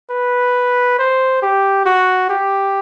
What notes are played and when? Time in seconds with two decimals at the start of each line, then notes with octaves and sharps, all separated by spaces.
0.10 B4
0.99 C5
1.42 G4
1.86 F#4
2.30 G4